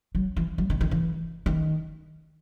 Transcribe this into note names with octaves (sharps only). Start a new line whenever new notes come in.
F#3
E3
F#3
D#3
D#3
E3
D#3